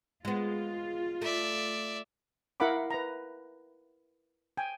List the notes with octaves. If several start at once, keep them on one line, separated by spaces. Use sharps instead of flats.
G#3 B3 F4
A3 D5 E5
E4 A#4 F5 F#5 B5 D6
B4 A#5
G5 G#5